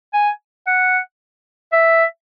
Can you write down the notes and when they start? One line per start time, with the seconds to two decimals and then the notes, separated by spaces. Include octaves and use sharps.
0.14 G#5
0.67 F#5
1.73 E5